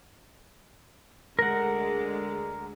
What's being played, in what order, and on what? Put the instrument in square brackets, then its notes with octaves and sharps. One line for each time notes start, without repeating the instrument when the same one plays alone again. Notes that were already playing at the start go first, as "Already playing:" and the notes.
[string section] D2 D3 G#3 [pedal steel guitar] A#4 F#5